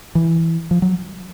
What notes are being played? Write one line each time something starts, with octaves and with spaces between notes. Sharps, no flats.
E3
F3
F#3